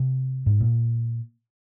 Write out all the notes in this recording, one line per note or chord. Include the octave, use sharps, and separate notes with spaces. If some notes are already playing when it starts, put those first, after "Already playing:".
Already playing: C3
G#2
A#2